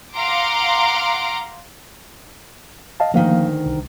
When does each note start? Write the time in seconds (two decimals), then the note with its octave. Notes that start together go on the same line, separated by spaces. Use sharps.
0.17 F5 F#5 A#5 C6 D6 D7
3.00 D#5 F5 A5
3.14 D2 D#3 F3 A#3 F5
3.66 C2